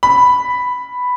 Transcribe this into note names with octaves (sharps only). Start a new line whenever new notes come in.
B5